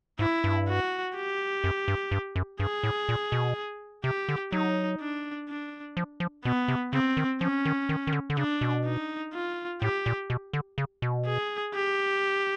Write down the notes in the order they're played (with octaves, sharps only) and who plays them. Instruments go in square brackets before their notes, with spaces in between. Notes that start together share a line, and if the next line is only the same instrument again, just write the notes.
[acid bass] G#2 [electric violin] E4
[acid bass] G2
[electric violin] F#4
G4
[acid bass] F#2
G2
G2
F#2
[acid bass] G2 [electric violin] G#4
[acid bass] A2
A#2
B2
[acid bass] C3 [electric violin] G4
[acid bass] D3
[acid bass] F#3 [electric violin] D#4
[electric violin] D4
D4
[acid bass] F3
F3
[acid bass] B2 [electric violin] B3
[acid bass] C3
[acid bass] C#3 [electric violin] C4
[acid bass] D#3
[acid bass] F3 [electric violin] C#4
[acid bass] D#3
D#3
D#3
D3
D3
[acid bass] C#3 [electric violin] D4
[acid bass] B2
[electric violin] D#4
F4
[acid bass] A2 [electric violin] G4
[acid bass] A#2
B2
D3
C#3
B2
[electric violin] G#4
G4